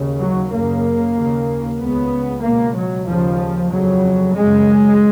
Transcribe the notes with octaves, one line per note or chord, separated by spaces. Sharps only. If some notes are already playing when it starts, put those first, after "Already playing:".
Already playing: D#2 C#3
F#3
F#2 C#3 A#3
D#2 C#3
C#2 C#3 B3
C#2 B2 A#3
F#3
D#2 C#3 F3
F2 C#3 F#3
F#2 C#3 G#3